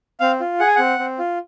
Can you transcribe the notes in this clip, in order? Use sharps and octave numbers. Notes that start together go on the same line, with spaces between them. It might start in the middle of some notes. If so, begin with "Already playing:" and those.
C4 F5
F4
G#4 F#5
G#5
C4 F#5
C4
F4